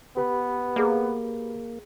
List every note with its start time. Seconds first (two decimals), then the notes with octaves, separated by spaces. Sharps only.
0.17 B3 G4 B4 B5
0.76 A#3 G#4 D5